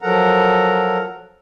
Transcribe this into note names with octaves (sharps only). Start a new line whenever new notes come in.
F3 F#3 A4 A#4 F#5 A#5